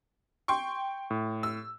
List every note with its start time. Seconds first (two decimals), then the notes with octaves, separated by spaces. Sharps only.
0.48 G5 C6 C#6
1.10 A2
1.43 E6